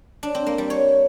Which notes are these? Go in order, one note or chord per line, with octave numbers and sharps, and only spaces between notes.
D4
C4
A#3
G3
C#5